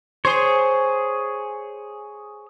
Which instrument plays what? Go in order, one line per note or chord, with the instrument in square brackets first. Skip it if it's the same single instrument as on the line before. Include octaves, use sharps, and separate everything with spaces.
[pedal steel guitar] G#4 C#5 [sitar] C5